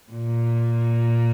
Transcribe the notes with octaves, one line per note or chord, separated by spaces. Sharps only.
A#2